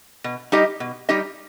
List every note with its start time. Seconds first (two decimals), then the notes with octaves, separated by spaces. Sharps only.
0.24 B2
0.52 G3 D#4 G4 D#5
0.80 B2
1.09 G3 D#4 G4 D#5